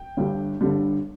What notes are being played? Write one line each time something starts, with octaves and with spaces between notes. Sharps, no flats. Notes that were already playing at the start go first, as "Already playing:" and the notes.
Already playing: G5
G1 G2 D3 G3
G1 G2 D3 G3